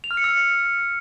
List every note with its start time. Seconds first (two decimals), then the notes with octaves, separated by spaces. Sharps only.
0.04 F7
0.11 F6
0.17 C#7
0.24 E6
0.31 C#7